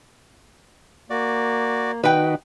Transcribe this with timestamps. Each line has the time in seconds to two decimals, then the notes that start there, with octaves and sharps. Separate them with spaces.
1.10 A#3 F#4 D5
2.04 D#3 D#4 F#4 B4 G5